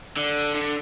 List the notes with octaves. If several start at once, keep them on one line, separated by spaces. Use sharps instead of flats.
D3
D3